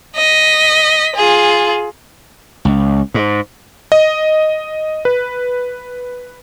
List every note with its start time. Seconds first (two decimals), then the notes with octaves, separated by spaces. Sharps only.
0.16 D#5 B6
1.16 F4 G#4
2.65 C#2
3.14 G#2
3.92 D#5
5.05 B4